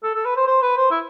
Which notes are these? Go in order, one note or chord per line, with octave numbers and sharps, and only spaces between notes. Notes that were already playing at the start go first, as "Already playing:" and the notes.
A4
A4
B4
C5
C5
B4
C5
E4